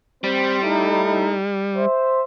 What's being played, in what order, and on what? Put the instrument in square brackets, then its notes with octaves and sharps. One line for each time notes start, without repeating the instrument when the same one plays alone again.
[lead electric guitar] G3 [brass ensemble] C4 C5
[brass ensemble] A3 D#4 E4
C5 E5